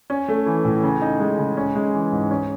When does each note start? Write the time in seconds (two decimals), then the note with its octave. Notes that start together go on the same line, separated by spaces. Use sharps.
0.10 C#4
0.28 A3
0.46 E3
0.65 A2
0.83 C#3
1.02 D#4
1.20 G#3
1.39 C#3
1.57 C#4
1.75 G#3
1.94 E3
2.12 G#2
2.31 C#4